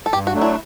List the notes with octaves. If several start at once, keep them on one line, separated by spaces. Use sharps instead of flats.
A4
G2 G4
F#4
F#3 A3 D4
E4